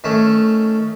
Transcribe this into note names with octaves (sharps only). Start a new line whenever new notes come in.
D#3 A3 C#4